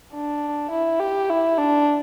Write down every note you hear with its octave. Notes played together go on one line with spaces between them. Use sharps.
D4
E4
G4
E4
D4